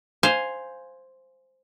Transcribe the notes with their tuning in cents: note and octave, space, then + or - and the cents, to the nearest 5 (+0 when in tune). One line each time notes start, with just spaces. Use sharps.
C5 +0 F5 +0 G#5 +0